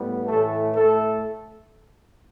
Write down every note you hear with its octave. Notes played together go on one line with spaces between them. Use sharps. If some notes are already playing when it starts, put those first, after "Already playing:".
Already playing: A2 G3 B3
A2 E3 A3 A4
A2 A3 A4